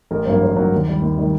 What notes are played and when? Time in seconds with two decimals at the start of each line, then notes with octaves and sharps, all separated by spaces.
0.11 A1 A#4
0.25 G2 F#3 A#3 C5
0.41 A1 C5
0.56 G2 F#3 A#3
0.72 D#2
0.87 D#3 G3
1.02 D#2
1.18 D#3 G3